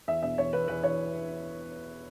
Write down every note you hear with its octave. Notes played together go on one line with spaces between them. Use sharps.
E2 E5
B2 E5
E2 C#5
E2 B4
E2 B4
E2 C#5